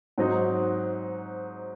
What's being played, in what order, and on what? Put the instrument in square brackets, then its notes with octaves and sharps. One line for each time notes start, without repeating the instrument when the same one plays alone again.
[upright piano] G#2 F#3 C4 D#4